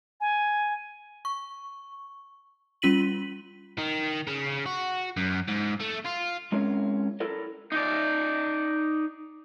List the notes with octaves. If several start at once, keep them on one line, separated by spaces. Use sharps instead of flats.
G#5
C#6
G3 C#4 F4 B6 D#7 F#7
D#3
C#3
F#4
F#2
G#2
A3
F4
G#3 C4 C#4 E4 A#4
E4 A4 A#4 D5
D#4 D5